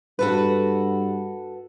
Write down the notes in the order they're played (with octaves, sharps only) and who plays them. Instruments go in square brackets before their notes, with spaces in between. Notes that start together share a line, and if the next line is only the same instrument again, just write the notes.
[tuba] G2 [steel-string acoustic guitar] F#4 A4 B4